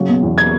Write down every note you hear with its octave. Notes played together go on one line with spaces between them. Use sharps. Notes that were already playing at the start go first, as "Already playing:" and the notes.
Already playing: C#3 F#3
B2
E2
G#6